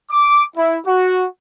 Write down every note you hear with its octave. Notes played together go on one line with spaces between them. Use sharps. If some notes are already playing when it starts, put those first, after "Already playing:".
D6
E4
F#4